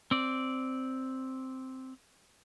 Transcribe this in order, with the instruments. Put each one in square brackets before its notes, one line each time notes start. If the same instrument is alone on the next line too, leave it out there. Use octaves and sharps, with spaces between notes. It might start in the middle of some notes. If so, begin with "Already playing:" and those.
[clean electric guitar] C4 D5